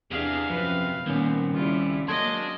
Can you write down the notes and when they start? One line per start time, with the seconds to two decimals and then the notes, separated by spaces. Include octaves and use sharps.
0.11 E2 C3 D4 G#4 F5
0.50 F#2 F3 B4
1.06 C2 A#2 D#3 B3 C#4
1.54 C#3 G3 E4 F4
2.08 F#3 G#3 A#3 D4 D#5 C6 G#6